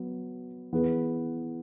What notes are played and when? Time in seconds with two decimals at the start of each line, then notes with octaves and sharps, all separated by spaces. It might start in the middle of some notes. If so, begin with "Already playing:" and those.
Already playing: F#3 B3
0.72 E3 B3 G#4 B4